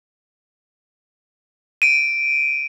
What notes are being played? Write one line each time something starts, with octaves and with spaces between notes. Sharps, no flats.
D7 D#7